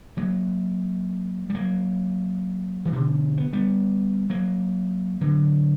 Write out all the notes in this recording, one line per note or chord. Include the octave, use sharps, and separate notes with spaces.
F#3 A#3
G3
F#3 A#3
E3
B2 D3
B3
G3 B3
F#3 A#3
D3 F#3